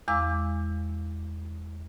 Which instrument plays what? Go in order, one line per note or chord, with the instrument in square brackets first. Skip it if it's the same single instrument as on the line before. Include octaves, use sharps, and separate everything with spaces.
[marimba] E2 G#3 F5 D6 E6